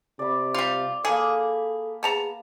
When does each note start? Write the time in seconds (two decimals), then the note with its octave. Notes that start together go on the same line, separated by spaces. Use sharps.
0.19 C3 D5 B5
0.54 G3 F4
1.05 A#3 G#4 A4 A5 B5
2.03 B3 G#4 A5 A#5